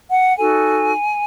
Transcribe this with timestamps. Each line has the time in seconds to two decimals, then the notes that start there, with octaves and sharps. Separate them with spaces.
0.11 F#5
0.37 D#4 F#4 A4 G#5